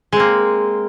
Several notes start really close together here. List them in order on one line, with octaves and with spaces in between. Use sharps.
G#3 C4 A#3